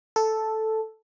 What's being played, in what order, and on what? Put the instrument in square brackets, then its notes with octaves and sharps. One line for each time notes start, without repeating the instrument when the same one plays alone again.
[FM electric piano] A4